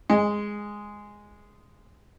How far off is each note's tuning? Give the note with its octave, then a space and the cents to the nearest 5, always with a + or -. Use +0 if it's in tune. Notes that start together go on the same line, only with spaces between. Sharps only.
G#3 -5